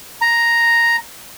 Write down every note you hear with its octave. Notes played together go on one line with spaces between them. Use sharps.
A#5